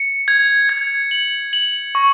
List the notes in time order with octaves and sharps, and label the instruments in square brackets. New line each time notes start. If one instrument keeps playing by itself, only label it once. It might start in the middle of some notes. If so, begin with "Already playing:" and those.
Already playing: [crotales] C#7
G#6
G#6
F#7
F#7
C#6